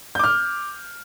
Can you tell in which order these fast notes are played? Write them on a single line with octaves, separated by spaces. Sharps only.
G6 D6 F6